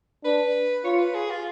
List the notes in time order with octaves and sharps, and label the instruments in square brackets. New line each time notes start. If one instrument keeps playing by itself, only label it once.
[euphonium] D4 [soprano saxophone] B4
[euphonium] F4 [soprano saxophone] C#5
[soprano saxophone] B4
G#4
F4